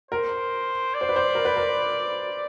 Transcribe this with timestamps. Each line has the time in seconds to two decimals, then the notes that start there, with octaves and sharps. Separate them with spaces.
0.11 A#4 C5
0.94 D5
1.01 C5
1.09 B4
1.16 C5
1.35 A#4
1.45 B4
1.56 A#4